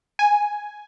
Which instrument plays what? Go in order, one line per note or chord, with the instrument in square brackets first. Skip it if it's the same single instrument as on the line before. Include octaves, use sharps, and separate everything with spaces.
[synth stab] G#5